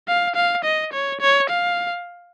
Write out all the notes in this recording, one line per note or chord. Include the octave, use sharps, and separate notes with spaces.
F5
F5
D#5
C#5
C#5
F5